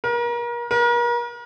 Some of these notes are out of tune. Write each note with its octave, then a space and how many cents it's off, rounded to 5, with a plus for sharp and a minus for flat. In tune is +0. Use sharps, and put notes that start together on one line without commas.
A#4 +35
A#4 +40